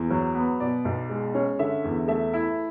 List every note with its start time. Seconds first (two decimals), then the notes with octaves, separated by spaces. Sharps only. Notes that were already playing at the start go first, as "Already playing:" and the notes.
Already playing: E2
0.10 F#3
0.35 B3
0.60 B2 D5
0.85 B1
1.09 G#3
1.34 C#4
1.59 D3 E5
1.84 E2
2.08 A3 E5
2.33 E4